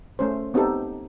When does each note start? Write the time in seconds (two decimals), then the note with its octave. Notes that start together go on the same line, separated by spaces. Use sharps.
0.19 A3 C#4 C5
0.54 B3 C4 D#4 G4 A4